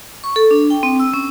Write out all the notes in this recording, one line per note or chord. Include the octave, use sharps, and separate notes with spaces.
C#6
A4
D4
G5
C4
E6
C#4